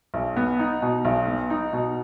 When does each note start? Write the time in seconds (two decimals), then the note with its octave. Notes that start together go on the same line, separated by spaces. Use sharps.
0.14 B1
0.36 B3
0.59 D#4
0.82 B2
1.05 B1
1.27 B3
1.50 D#4
1.73 B2